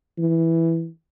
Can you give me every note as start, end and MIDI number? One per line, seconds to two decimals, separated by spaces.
0.19 0.88 52